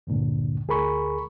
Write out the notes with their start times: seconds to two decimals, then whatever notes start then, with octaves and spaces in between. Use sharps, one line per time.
0.07 D2 G2 A#2 D3
0.68 D2 G#4 A#4 B5 C#6